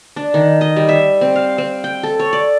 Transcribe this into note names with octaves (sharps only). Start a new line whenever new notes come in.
D4
D#3
D#5
G3
E5
C4
F5
C4
G5
A4
C#5
D5